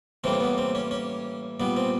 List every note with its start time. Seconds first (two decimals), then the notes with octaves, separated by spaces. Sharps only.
0.24 A2 E3 G3 A#3 C4
0.41 B3
0.58 C4
0.75 C#4
0.91 C#4
1.60 A#2 G3 B3
1.77 C4